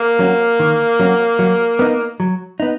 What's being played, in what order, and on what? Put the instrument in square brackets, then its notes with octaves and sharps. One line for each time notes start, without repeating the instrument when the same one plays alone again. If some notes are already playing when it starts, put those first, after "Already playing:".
Already playing: [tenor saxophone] A#3
[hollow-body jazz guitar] F#3 C#4 F#4
D#3
F#3 C#4 F#4
F#3
B3 D#4
F#3
B3 D#4